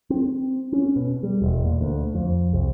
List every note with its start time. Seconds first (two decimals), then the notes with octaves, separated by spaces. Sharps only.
0.10 C4
0.72 C#4
0.96 B2
1.23 G3
1.42 E1
1.65 A#2
1.81 D2
2.14 F2
2.53 C2